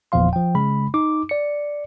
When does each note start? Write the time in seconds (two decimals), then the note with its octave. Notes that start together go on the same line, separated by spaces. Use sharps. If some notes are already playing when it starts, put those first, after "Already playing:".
0.12 G1 E2 A#2 F3 F5 C6
0.33 F3 G5
0.55 C#3 G#3 B5
0.94 D#4 D6
1.29 D5 C#7